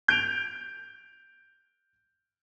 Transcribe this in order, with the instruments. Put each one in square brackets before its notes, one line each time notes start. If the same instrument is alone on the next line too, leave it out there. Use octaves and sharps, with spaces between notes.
[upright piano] G6 D7 F7